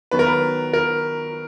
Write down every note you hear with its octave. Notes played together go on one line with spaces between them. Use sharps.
D#3 F#3 B3 B4
A#4
B4
A#4